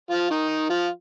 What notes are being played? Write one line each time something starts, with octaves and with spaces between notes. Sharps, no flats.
F3 F4
D#3 D#4
F3 F4